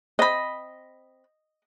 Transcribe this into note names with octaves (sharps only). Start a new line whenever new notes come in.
C4 D#5 B5